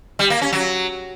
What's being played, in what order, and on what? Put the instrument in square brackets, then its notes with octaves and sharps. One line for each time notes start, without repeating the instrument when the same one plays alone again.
[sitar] G3
A#3
C#4
F#3